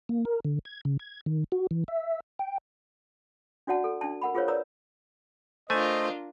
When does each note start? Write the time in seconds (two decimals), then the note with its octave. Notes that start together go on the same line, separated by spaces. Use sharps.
0.09 A#3
0.25 A#4
0.45 D3
0.65 G#6
0.85 C#3
0.99 G#6
1.26 D#3
1.52 F#4
1.71 E3
1.88 E5
2.39 G5
3.67 D4 F#4 D5 F#5 A5
3.84 A4
4.01 D4 A5
4.22 A#4 F#5 B5
4.35 F4 G#4 A#4 C5 C#5 F5
4.48 A#4 B4 D5 A#5 E6
5.70 A3 D4 F4 A#4 C5 D#5 G#5